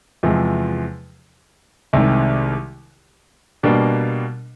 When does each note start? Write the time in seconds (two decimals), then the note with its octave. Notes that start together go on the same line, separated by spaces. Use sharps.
0.23 E2 C3 F3 G#3
1.93 C2 C3 D#3 G#3
3.63 B2 G3 A#3 D4